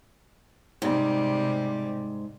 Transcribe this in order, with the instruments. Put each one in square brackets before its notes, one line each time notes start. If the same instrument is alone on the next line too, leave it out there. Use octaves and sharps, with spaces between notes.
[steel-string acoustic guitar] G#2 [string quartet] C3 G3